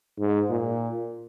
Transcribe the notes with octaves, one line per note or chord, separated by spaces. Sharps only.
G#2
A#2